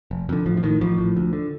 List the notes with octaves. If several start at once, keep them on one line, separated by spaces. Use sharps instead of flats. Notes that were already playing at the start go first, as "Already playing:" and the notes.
F1
F2 D3
A1 F3
F3
A2 D#3
A1 F3
A2
D2
D3